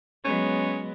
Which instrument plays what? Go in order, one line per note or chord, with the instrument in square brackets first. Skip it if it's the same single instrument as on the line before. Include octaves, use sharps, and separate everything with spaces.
[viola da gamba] F#3 G#3 B3 [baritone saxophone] C#4